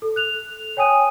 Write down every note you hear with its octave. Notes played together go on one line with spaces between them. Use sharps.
A4
F#6 F7
C#5 G5 G#5 D#6 D#7